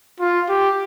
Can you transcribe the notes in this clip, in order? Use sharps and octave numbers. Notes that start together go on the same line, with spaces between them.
F4
G4